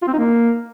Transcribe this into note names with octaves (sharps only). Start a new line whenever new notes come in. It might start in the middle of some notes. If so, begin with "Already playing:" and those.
F4
C4
D#4
A#3